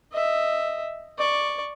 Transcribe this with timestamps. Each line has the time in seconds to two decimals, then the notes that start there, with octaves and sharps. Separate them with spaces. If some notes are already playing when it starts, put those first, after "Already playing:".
0.12 D#5 E5
1.18 D5 C#6